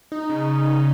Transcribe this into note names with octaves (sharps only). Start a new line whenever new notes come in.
D#4
C#3